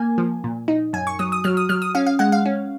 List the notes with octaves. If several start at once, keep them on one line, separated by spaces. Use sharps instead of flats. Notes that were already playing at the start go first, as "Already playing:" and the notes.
Already playing: A#3 G#5
F3
A#2
D#4
F#2 G#5
C#6
F#3 D#6
D#6
F#3 F6
D#6
F#3 F6
D#6
C#4 F5
F5
G#3 F#5
F5
C#4